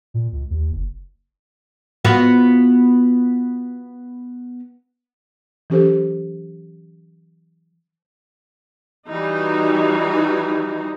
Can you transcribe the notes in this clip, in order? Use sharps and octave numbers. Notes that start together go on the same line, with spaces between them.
A#2
C#2
D#2
F#1
B3 F4 F#4
E3 F#3 C#4 G4 A4 C5
E3 G3 D#4 F#4